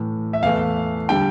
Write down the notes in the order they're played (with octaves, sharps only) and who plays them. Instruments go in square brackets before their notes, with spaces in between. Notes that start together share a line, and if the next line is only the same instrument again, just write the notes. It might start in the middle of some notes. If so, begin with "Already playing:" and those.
Already playing: [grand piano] A2 E3 A3
E5
E2 E3 A3 F5
D3 G3 G5